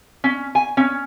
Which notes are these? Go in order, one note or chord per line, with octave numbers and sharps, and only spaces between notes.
C#4
G#5
C#4